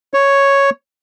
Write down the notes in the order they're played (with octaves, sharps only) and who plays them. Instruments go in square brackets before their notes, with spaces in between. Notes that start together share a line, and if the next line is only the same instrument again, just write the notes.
[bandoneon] C#5